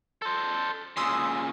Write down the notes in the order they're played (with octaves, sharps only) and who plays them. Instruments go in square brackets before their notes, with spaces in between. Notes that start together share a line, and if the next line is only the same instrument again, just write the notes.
[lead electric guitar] A4 C5
[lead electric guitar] A#2 C#3 [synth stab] C6 D#6 E6